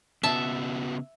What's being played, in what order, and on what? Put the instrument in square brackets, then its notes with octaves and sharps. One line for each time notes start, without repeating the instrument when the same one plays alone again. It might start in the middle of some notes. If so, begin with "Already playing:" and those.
[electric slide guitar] C#3 B3 F#4 [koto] E5 A5